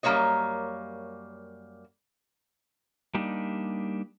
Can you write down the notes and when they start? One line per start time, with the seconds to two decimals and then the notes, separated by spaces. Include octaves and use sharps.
0.03 F#2 G3 A#3 C#4 C#5 D#5
3.14 G3 A#3 D4 D#4 G4